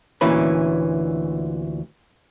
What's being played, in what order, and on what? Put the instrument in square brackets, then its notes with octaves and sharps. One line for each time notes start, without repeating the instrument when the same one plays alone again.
[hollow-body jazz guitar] D2 A#2 E3 C#4 B5